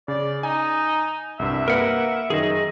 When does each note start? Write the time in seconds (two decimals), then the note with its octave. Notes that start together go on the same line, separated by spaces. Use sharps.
0.08 C#3 D5
0.43 D#4 G#5
1.39 C2 G2 E5
1.68 A#3 A#4 B4 F#5
2.30 F#2 D#3 G#4 D#5